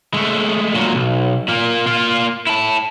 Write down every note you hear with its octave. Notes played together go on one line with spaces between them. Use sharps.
G#3 A3
A#2 F#3
B1
A#2 A#3
A#3 F4
E4 A5